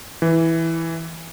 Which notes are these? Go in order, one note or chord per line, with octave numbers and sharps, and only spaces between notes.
E3